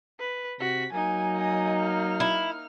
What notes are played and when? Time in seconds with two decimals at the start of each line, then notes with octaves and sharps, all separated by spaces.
0.19 B4
0.60 C3 F#4 B6
0.93 F#3 A#3 D#4 G#5
1.36 D#5 G#5
1.80 F6
2.20 E4